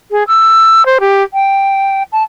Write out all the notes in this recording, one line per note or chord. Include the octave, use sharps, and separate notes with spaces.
G#4
E6
C5
G4
G5
A5